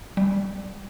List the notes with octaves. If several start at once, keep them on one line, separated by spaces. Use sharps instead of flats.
G3